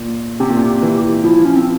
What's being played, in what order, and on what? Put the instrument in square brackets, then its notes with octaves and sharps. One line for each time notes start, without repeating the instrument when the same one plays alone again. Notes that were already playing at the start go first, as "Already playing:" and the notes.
Already playing: [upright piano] A#2
[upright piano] C3 [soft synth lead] G4
[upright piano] A#2
C3
E3
[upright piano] F3 [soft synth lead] E4
[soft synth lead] E4
C#4
C4